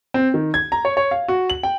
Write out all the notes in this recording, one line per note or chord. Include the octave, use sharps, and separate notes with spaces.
C4
D#3
G#6
A#5
C#5
C#5
F5
F#4
F#7
G5